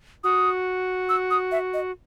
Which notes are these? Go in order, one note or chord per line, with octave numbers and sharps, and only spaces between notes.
F#4 D#6
E6
D#6
E5
D#5